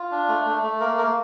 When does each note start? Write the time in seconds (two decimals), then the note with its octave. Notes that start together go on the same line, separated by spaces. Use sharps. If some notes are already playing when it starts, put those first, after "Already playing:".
Already playing: F4
0.11 D4
0.28 A3
0.45 A3
0.63 A3
0.80 A#3 A#4
0.97 A#3 A#4